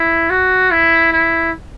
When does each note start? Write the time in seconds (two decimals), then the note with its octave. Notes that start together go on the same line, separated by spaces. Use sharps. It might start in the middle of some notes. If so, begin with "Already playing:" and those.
Already playing: E4
0.30 F#4
0.71 E4
1.12 E4